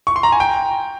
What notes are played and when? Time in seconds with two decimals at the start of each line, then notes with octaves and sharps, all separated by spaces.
0.07 C#6
0.16 C6
0.23 A#5
0.32 G#5
0.40 G5